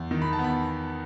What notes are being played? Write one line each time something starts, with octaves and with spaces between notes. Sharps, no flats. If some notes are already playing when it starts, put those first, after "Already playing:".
Already playing: E2
D#3
B5
A5
B3
B5